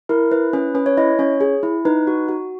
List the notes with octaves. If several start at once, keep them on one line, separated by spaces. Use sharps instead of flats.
E4 A#4
E4 B4
C#4 B4
C#4 B4
C#5
E4 D#5
C#4 C#5
G#4
E4
D#4 B4
F#4
F#4